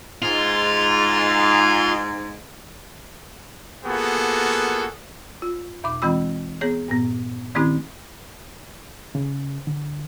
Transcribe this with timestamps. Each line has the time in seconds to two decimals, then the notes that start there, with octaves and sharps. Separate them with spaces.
0.22 G#2 F4
3.85 A#3 B3 F4 F#4 G#4 A4
5.42 F4
5.84 E2 B2 D6
6.02 E3 G#3 C4 F4 B5 E6
6.61 B3 G#4 C#5
6.88 G2 A#2 B3
7.55 D#3 A3 C4 C#4 E4 G4
9.15 C#3
9.67 D3